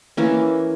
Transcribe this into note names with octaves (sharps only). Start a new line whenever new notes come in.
E3 A#3 C#4